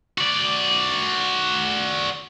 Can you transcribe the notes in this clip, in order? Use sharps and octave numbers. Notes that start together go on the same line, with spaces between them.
F#4 D5